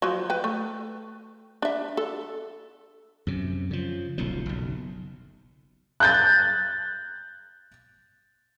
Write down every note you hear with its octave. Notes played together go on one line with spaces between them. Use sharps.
F3 F#3
B4 G5
A3
D4 E5
A4
F#2 C3
C#3 F3
D#1 B1 A2 F3
F#1 B1
F#6 G6 A6